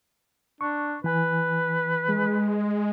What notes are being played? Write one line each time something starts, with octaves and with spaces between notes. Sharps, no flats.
D4 C#6
E3 B4 G#5
G#3